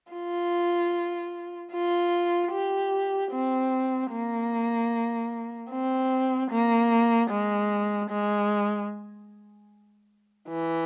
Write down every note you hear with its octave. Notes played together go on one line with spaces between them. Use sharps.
F4
F4
G4
C4
A#3
C4
A#3
G#3
G#3
E3